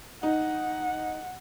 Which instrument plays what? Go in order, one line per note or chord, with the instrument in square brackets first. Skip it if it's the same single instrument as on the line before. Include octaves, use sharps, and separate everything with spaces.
[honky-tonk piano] D#4 [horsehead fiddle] F#5